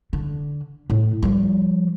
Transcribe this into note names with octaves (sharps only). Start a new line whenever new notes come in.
D3
A2
F3 G3